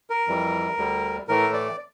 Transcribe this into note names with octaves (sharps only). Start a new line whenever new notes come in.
A#4
F2 E3 G3
D2 D3 G3
A2 E3 A3 A#4
D5